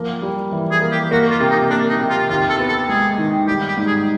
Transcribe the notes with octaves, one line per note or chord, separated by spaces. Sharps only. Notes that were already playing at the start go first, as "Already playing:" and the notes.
Already playing: F3 A#3
G3
E3
G#4
A#3
G4
A#3 F#4
F4
C3
D#4
A#3 D4
D#4
C3
F4
D#2 F4
A4
B3
A4
G#3 G#4
D#3
G3 G4
G4
G#2
G#4